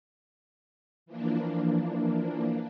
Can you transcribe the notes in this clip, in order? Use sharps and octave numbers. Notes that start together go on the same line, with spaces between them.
E3 F3 A#3 D4